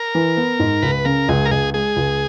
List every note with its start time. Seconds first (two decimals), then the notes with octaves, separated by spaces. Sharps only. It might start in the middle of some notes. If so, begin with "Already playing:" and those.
Already playing: A#4
0.15 E3
0.37 B3
0.60 G#2
0.82 C#2 B4
1.05 C#3 A#4
1.28 C#2 G#4
1.45 A#4
1.51 C#2 G#4
1.74 G#3 G#4
1.96 C#2